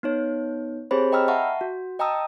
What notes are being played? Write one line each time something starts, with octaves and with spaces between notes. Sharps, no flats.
B3 D#4 C#5
C4 G4 G#4 C5 C#5 B5
D#5 G5 A#5 B5 E6 F6
E5 F#5 A5 C#6
F#4
D#5 G5 A5 A#5 D#6 E6